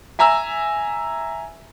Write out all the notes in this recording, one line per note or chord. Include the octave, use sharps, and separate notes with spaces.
E5 G#5 A#5 E6